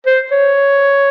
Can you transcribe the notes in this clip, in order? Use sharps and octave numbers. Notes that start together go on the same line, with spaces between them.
C5
C#5